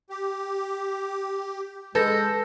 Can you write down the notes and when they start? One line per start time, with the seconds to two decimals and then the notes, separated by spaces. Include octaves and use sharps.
0.10 G4
1.95 G#3 A4 B4 G6 A#6